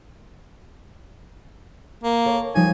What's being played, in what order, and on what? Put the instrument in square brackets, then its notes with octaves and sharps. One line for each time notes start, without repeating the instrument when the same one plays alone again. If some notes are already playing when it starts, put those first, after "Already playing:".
[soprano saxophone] A#3
[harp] A4 C#5
[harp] F3 G3 D#4 [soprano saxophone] G#5